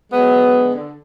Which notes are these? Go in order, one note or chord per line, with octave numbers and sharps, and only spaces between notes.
F#3 G#3 B3
D3
D3
D3